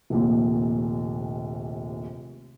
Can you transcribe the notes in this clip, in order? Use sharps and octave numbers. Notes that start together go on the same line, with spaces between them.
F1 A#1 D#2